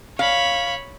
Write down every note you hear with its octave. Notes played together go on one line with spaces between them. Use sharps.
C#5 F5 B5